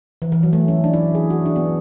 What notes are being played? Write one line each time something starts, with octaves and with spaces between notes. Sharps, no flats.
E3
E3
F#3
A3
C#4
D4
E4
G#4
F#4
D4
B3